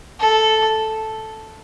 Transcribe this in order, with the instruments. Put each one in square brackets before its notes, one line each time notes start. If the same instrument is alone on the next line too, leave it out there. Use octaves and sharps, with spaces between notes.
[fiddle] A4